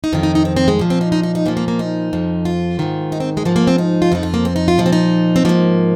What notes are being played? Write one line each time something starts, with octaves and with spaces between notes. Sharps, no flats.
D#4
F2 D#3 F4
D#4
D#4
C4
C4
G#3
A#2 F3
C4
D#4
D#4
D#4
D#4
A#2 F3 A#3
A#3
A#3
D#4
F2 F3
F4
G#2 D#3
D#4
C4
G#3
G#2 F3 A#3
A#3
C4
D#4
F4
F2 F3 D#4
F4
A#3
C4
D#4
F4
A#2 F3 D#4
C4
D#4
C4
G#2 F3 A#3